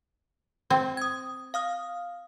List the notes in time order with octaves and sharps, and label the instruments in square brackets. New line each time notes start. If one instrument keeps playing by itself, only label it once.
[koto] C4
[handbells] D#6 G#6
F5 D#6 F6